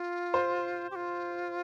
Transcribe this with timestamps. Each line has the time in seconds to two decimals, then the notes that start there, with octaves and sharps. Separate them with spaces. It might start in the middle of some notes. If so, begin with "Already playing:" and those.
Already playing: F4
0.34 C5
0.91 G4
0.96 F4